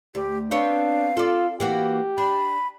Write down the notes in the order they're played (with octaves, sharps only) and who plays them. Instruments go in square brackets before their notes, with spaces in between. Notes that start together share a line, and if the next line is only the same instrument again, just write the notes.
[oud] D2 [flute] G4
[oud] B3 C4 C#5 [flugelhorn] D4 [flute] F5
[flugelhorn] F4 [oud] A4 D5
[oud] E3 A#3 F#4 [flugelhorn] G4
[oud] D4 [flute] B5